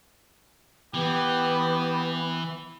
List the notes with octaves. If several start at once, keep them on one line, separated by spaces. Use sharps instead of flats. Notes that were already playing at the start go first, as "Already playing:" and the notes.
E3 B3 G4